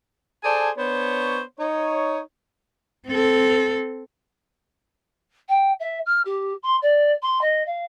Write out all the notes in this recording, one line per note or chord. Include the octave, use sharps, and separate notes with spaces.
G#4 A4 C5 D5 G#5 A5
B3 D4 C5 C#5
D#4 C#5
C4 A4
G5
E5
F6
G4
C6
D5
C6
D#5
F5